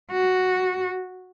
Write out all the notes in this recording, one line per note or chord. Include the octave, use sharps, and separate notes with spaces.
F#4